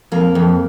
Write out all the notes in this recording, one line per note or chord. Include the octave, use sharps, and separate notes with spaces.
F2 A#3
F2